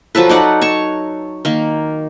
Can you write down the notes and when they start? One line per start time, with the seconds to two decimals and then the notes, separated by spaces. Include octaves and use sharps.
0.15 F3 F#3 A4 B4
0.29 D#4 D5 F#5
0.61 C#5 A5 C#6
1.45 D#3 A#3